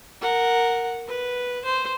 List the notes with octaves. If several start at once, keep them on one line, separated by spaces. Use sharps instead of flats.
A#4 F#5
B4
C5